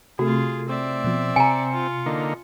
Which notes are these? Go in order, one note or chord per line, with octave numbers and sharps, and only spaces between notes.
C3 A3 F4 F#4 G#4
C4 D5 E5
B2 F3
C3 G#5 A#5 C#7
F4
D3 A#3 D#4